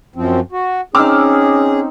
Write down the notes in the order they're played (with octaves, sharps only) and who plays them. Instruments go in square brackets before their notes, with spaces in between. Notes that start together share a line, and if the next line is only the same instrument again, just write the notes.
[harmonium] F#2 F3 C4
F#4
[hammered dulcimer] C4 D#4 [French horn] C#4 [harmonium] G#4 [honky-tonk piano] D6 E6 F6